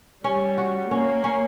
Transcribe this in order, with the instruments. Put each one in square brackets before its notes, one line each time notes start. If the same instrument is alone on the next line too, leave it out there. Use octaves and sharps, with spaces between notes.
[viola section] G3 [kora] C#4
[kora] F#4
[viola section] A#3 [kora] C#4
[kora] C#4